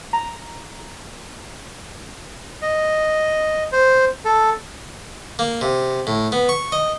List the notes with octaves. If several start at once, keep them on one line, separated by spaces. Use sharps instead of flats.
A#5
D#5
C5
A4
A#3
C3
A2
B3
C#6
D#5